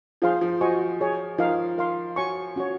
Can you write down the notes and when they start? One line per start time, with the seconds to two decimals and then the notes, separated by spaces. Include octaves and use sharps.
0.22 F3 F4 G#4 C5 F5 C6
0.41 F3
0.61 F#4 C5 D#5 G#5 C#6
1.00 G#4 C#5 G#5
1.38 F3 D#4 A#4 F5
1.78 A#4 F5 C6
2.16 F#4 C#5 G#5 C#6
2.56 C#4 F#4 C#5